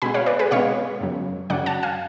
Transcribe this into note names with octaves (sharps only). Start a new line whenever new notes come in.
B2 G#3 B3 G#5 B5
C#5 F5
B4 D5
G#4 B4
B2 G#3 B3 C#5 F5
F#2 C#3 F#3
F#2 C#3 F#3 D5 F#5
F#5 A5
F5 G#5